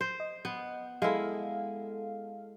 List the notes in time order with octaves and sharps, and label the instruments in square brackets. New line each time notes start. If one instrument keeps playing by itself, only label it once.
[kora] C5
[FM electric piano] D#5
[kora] B3
[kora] G#3 E4 [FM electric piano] A4 F5